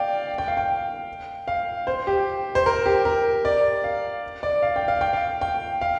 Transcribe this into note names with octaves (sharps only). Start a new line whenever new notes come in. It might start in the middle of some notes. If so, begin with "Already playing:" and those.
Already playing: D5 F5 G5
G5
F5
G5
F5
C5
G4
C5
A#4
G4
A#4
D5
F5
D5
F5
G5
F5
G5
F5
G5
F5